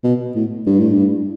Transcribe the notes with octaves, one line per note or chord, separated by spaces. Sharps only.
B2
A2
G2
A2
G2